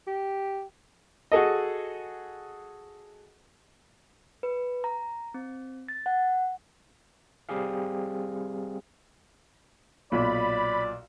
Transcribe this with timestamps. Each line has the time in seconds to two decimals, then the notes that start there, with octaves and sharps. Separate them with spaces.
0.07 G4
1.32 F#4 G#4 A4 D#5
4.43 B4
4.84 A#5
5.34 C4
5.88 A6
6.06 F#5
7.49 G3 C4 G4 G#4 F5
10.12 B1 A#2 D5 B5